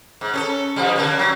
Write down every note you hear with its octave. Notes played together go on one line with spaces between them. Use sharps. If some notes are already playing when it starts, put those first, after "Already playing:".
G#2
C#4 G#4 A4
G2 F3 G3
D3 A#3 C#4
F#3